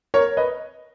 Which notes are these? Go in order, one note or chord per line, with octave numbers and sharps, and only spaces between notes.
A#4 C#5
B4 D#5